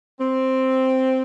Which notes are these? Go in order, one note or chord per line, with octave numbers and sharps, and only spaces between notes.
C4